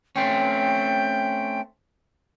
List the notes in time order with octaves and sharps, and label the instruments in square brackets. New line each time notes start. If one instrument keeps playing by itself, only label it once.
[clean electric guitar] A3 C4 C#4 [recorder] G5